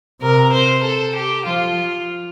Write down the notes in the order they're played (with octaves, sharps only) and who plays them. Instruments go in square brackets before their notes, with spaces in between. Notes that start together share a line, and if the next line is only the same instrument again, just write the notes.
[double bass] C3 [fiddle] A#4
[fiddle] C5
A4
G4
[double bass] F3 [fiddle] F4